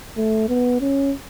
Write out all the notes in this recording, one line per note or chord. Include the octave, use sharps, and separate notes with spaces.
A3
B3
C#4